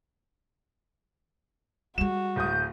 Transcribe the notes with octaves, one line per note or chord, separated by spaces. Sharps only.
G3 G#3 F#4 E7
D1 D#6 G6